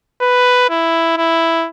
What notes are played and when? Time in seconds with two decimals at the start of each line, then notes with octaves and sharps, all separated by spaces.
0.22 B4
0.70 E4
1.17 E4